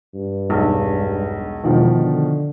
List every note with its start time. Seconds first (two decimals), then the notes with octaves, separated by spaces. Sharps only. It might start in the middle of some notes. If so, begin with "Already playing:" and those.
0.14 G2
0.49 E1 B1
1.63 E1 B2 D#3 F3
1.99 D3